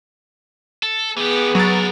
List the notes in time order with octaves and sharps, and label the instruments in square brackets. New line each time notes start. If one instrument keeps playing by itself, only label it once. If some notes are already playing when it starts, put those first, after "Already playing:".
[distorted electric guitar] A4
[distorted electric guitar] E3 G4 [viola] B3 G#4
[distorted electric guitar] C#3 A#4 [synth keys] F#3 A6